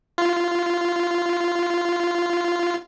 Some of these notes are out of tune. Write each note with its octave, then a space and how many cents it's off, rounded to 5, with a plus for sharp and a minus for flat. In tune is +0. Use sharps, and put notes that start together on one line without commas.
F4 -10